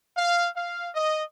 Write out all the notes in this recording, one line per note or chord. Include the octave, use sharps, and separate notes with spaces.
F5
F5
D#5